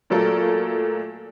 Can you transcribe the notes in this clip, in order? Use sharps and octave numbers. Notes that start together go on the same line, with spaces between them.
A#2 F#3 A3 A#3 A4 A#4